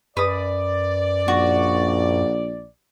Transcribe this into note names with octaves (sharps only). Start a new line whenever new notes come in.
F#2 B4 D5 D#6
A#1 F#4